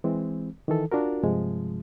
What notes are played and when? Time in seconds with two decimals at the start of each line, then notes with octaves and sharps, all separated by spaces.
0.04 E3 G#3 C4
0.68 D#3 E3 A4
0.92 D4 F4 F#4 A#4
1.23 G2 C3 F3 G#3